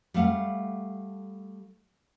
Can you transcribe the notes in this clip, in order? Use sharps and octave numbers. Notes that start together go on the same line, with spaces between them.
G3 A3 F5 F#5